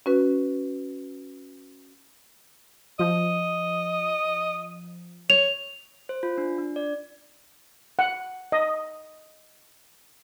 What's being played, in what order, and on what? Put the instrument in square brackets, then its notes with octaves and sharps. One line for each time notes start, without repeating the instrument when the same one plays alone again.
[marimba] C#4 F#4 B4
[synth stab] F3 [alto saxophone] D#5
[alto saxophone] C#5 [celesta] F7
[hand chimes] C5
F4
D4
D4
D5
[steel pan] F#5
D#5